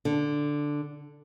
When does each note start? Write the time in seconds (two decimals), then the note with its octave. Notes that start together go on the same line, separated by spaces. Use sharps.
0.05 D3